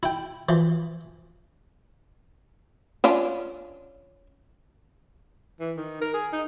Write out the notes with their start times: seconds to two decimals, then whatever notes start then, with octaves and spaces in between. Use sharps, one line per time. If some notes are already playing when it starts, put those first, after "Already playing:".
0.03 E4 G5
0.49 E3 F3
3.04 C#4 D4 F4
5.60 E3
5.77 D#3
6.01 A#4
6.14 G#4
6.33 D#4